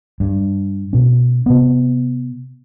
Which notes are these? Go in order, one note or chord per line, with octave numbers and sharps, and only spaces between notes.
G2
B2 C#4
C3 B3